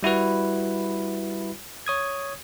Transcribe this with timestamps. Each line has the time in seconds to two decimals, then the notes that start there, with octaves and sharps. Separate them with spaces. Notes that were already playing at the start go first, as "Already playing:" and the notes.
0.03 G3 E4 F#4 B4
1.87 C#5 D#6 G#6